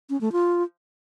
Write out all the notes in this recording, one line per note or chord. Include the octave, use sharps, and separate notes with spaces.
C#4
A3
F4